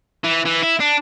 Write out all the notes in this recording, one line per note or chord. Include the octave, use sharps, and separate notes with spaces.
E3
E3
E4
D4